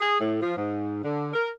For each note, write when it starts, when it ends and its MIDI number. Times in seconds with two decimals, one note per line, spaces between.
0.01 0.19 68
0.21 0.41 45
0.42 0.57 53
0.57 1.00 44
1.04 1.32 50
1.34 1.50 70